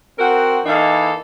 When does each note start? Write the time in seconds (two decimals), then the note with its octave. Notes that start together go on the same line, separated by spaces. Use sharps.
0.19 C4 F#4 A#4 F#5
0.66 E3 A#3 D#4 A4